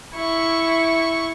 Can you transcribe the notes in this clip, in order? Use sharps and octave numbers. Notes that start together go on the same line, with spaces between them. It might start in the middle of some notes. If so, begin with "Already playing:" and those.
E4 C#6